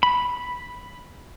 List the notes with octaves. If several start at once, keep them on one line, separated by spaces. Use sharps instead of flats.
B5